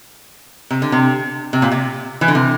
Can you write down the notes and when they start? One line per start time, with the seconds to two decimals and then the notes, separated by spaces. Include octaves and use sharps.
0.71 C3
0.82 D3
0.92 C3
1.53 C3
1.62 A#2
1.72 C3
2.21 E3
2.28 D3
2.35 C3